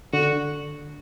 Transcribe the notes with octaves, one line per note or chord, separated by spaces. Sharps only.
D3 F#4